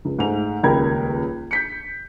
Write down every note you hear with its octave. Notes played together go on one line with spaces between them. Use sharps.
C#2
G#2 G#3 A3 F7
D#1 C#2 A#4 G5 B5 G#6
G6 B6 C#7